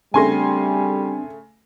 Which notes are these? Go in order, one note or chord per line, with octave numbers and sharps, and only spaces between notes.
C#3 G3 A3 C4 D4 G#5 C6 A#6